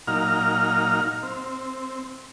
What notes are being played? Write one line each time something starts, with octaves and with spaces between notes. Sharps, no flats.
A#2 F#3 D#4 F5 A#5 F6
C4